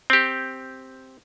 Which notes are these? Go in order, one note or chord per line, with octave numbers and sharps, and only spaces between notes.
C4 G4